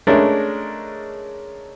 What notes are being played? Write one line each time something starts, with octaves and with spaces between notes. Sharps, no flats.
G#3 A3 C#4 D4 A#4